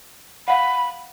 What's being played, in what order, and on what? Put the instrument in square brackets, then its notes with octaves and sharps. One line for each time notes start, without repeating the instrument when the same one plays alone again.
[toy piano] F5 F#5 [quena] B5